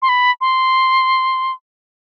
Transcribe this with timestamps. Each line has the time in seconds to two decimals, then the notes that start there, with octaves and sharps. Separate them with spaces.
0.02 C6
0.09 B5
0.41 C6